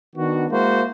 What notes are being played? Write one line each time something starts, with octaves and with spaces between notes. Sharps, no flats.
D#3 B3 D4 F#4
G#3 A#3 E4 F#4 C5